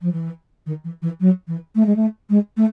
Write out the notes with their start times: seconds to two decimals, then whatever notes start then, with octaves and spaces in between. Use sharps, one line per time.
0.02 F3
0.13 E3
0.66 D#3
0.84 E3
1.02 E3
1.20 F#3
1.48 E3
1.75 A3
1.86 G#3
1.96 A3
2.30 G#3
2.57 A3